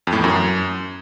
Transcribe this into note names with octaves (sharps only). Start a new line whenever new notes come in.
F2
A2
E2
F#2